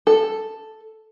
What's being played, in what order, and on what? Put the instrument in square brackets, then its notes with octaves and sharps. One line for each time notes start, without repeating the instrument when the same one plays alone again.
[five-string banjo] A4